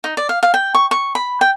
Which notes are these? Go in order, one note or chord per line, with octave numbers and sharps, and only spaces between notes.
D#4
D5
F5
F5
G5
C#6
C#6
B5
G5